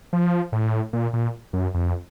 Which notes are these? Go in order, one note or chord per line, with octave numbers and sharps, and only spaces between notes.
F3
A2
A#2
A#2
F#2
F2